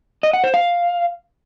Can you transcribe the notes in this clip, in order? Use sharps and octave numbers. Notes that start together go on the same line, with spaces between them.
D#5
F#5
C5
F5